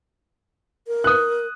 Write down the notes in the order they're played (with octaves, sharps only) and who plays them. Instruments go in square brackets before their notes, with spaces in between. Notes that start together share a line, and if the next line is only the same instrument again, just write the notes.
[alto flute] A#4
[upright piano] D#6 F#6